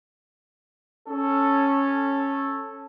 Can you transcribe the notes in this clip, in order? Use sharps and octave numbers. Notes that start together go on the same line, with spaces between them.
C#4 A4